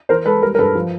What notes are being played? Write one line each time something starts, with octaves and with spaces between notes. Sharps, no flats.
E3 A#4 C5
G#3 A4 B4
G3 A#4
A#4
G2 A4 B4
F3